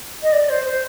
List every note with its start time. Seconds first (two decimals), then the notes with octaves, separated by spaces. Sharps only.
0.22 D#5
0.32 D5
0.49 C5
0.64 C5